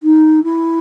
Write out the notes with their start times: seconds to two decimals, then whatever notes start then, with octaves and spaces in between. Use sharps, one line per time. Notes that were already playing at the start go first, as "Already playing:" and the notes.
0.03 D#4
0.44 E4